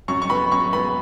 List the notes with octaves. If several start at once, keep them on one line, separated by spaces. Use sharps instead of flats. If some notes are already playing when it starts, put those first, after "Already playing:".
F#2 C#6
C#6
B3 B5
F#2 C#6
B3 B5